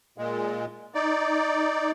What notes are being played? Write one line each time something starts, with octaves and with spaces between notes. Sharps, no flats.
A#2 G#3
D#4 D5